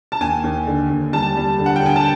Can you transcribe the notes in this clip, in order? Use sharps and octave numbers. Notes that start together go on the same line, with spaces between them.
A5
D#2 G#5
D#2
D3
D#2
G3 A5
G3
D3
F#5
G5
D3 G#5
A5